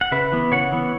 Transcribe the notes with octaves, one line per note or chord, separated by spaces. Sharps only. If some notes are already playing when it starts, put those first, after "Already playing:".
F#5
C#3 B4 E5
E3 B3
C#3 C#5 F#5
E3 B3